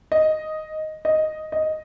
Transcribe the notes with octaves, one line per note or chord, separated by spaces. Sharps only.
D#5
D#5
D#5